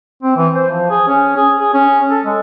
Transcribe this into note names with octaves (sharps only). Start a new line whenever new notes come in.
C4
E3
C5
F3
G#4
C#4
G#4
G#4
C#4
A4
G#3